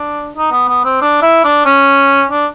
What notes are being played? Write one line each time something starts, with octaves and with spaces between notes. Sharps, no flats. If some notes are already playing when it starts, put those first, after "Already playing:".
Already playing: D4
D#4
B3
B3
C4
D4
E4
D4
C#4
D4